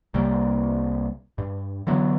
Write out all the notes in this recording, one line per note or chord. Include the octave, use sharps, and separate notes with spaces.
C2 C3 G3 A#3
G2
D3 E3 F#3 B3